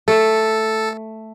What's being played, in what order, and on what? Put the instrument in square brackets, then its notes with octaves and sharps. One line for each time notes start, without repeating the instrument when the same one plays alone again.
[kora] A3 [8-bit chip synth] A4